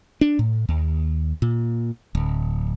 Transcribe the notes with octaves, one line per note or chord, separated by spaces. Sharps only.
D4
A2
D#2
A#2
D1